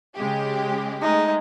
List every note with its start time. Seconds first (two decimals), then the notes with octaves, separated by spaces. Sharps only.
0.15 C#3 G#3 G4
1.02 G#3 A3 D#4